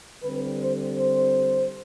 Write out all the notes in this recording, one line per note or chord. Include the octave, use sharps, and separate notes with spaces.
D3 G3 C4 B4
C5
C5